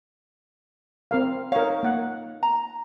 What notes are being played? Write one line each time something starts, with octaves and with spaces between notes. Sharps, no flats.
C4 A#4 F5
D#4 A#4 C#5 F5
A#3 F#5
A#5